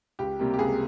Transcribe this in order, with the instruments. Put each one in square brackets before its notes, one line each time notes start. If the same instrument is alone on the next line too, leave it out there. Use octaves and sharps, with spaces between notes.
[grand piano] C#2 G4
C3 G3 A#3
G4
C#2 G#4